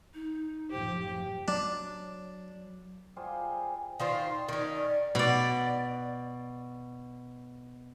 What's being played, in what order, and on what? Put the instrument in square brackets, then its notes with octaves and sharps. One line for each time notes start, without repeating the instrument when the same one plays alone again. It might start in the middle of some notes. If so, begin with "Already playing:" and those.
[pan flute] D#4
[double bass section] F#1 A2 F3 [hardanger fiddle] G4 [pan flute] C5
[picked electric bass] F#3 [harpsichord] D4
[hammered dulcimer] G3 F4 G#4 C5
[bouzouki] D#3 F4 C5 [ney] D5
[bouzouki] D#3 C#4
[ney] D5
[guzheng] B2 D5